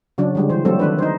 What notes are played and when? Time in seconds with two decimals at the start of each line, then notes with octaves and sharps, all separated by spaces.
0.18 C#3 F#3 D4
0.35 D3 G3 G#3
0.49 E3 C5
0.65 F#3 G3 A3 C4 A4
0.79 D#3 D4 B4
0.99 D#4 C5